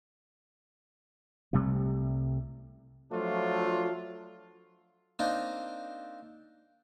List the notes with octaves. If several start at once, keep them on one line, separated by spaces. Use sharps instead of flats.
C2 C3 G3 A3
F3 F#3 A3 D4 F4
A#3 C4 D4 D#4